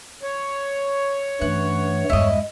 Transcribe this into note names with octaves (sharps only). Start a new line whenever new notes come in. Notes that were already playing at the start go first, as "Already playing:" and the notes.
C#5
G2 E3 A3 C#4 F#5
E2 G2 G#3 E4 D#5